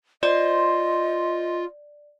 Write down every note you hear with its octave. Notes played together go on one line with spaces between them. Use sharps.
F4 C5 D5 D#5